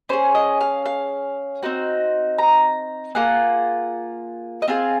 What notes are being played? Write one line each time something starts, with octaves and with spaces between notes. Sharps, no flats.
C#4 G#4 C5
D#5
F5
F5
C4 D#4 F#4
A#5
A#3 F4 G#4 F#5
D#5
C4 F4 G#4 F5